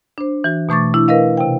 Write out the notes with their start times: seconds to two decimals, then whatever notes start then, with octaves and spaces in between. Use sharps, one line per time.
0.18 D4 C5
0.44 E3 F#4
0.69 B2 E3 A3 C#6 D6 A6
0.94 D4 E4
1.08 A#4 B4 D#5 F5
1.37 C3 G5